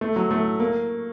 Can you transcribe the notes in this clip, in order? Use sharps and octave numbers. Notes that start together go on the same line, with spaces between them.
A3
F#3
A3
A#3